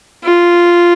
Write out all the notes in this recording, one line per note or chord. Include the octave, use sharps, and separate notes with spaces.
F4